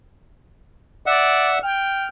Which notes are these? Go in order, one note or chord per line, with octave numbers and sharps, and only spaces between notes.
D5 E5 F#5
G5 F6